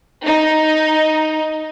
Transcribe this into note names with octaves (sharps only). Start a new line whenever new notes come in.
D#4